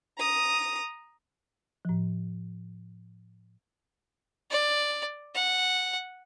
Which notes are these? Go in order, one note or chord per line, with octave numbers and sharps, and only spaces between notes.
A#5 D#6
A2 F3
D5
F#5